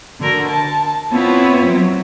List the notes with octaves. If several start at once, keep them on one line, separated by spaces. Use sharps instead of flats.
D3 F#4 A#4
A5
B3 C4 E4 F4 C5 C#5
F#3